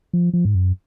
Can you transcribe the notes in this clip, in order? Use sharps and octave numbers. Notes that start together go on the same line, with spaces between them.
F3
F3
G#2
F#2